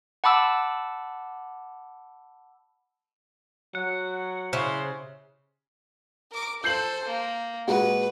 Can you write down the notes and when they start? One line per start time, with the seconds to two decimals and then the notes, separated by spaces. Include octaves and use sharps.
0.24 F#5 A5 B5 D6 E6
3.75 F#3 F#5
4.53 C#3 E4 C5
6.32 A#4 D6
6.64 A4 C5 G6 C7 F#7
7.06 A#3
7.67 A#2 G#3 F#4 B4